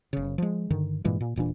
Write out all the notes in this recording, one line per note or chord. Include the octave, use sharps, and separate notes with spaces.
F#1 C#3
F3 G#3
G2 D3 D#3
G2 A#2 E3 G#3
A#2
D#1 A#2 E3 D4